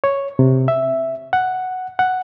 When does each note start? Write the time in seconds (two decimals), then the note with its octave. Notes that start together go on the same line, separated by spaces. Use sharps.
0.04 C#5
0.39 C3
0.68 E5
1.33 F#5
1.99 F#5